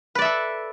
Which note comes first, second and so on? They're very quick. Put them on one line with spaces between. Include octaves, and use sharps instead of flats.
B4 D5 E5 A4